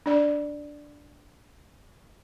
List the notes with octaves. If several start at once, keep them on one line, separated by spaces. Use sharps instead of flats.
D4 D5